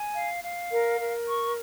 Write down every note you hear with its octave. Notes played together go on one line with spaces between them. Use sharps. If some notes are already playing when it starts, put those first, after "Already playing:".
Already playing: G#5
F5
F5
A#4
A#4
C#6